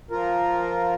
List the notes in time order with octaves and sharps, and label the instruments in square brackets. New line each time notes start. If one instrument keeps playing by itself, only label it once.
[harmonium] F3 F4 A#4